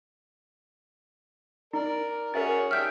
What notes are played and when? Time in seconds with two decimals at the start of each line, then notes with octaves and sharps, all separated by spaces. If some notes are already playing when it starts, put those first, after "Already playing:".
1.73 D#4 A#4 D5
2.34 C#4 F#4 G#4 A#4 E5 A6
2.71 D#3 D4 G4 E5 F6 G6